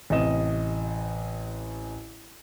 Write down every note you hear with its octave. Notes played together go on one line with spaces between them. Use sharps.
A1 C3 D#5 E7